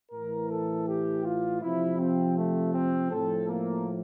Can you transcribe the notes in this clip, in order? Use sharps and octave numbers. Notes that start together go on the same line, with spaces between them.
A2 E3 A#4
A4
G4
F4
C3 F3 E4
C4
A3
C4
A2 F3 A4
A#3